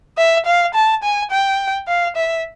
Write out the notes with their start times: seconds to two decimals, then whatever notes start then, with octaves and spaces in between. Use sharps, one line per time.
0.18 E5
0.46 F5
0.74 A5
1.03 G#5
1.31 G5
1.88 F5
2.16 E5